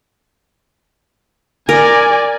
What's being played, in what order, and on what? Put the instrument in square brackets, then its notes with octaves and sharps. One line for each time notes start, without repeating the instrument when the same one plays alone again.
[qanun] A#4 [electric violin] D5 G#5